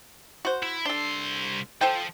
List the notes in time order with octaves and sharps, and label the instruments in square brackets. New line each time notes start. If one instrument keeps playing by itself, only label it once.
[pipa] F#4 C5
[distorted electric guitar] E4
[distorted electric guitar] C2 C6 [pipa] D4 A4
[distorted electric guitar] F3 [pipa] A4 C5 G5